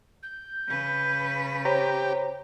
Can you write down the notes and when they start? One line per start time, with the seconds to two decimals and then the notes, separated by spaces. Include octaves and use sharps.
0.23 G6
0.68 C#3 B4
1.65 G4 C5 C#5 A#5